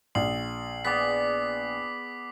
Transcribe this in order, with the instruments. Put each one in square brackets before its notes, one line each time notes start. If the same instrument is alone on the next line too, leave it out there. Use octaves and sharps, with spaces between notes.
[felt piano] A#1 [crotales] C7 F#7
[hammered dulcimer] B3 G#4 D5 [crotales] D6 B6